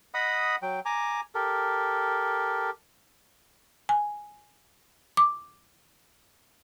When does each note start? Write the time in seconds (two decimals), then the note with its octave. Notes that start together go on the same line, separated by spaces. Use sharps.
0.14 D#5 F#5 B5 D#6
0.62 F#3 G5
0.85 G#5 A#5 D6
1.35 G4 A4 A#4
3.89 G#5
5.17 D6